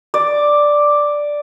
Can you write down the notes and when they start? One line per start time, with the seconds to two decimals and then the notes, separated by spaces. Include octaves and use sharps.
0.14 D5